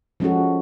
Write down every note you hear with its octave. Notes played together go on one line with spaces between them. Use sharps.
F3 G#3 C#4 F#4 A4